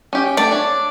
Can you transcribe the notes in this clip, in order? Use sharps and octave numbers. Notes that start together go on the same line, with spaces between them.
C#4 G4 G5
A3 D5
D4 C#5